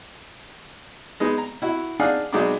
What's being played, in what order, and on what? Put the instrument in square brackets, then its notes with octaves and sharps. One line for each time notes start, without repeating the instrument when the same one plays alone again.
[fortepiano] G#3 B3 D#4
A#5
E4 F#4
D4 D#4 G#4 D5 F5 F#5
B1 G#3 D#4 F#4 D5 D6